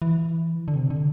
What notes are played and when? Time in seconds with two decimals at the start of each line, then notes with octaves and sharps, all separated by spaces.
0.02 E3
0.68 D3
0.76 C3
0.90 D3